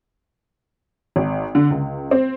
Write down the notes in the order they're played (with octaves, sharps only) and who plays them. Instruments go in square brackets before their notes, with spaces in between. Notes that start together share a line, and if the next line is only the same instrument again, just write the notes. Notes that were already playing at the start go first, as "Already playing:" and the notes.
[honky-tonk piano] G#1
D3
C#2
C4